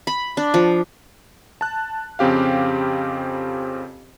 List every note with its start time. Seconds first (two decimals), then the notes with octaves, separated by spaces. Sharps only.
0.07 B5
0.37 D4
0.54 F3
1.61 A5 F#6
2.19 F2 C#3 C4 G4 F5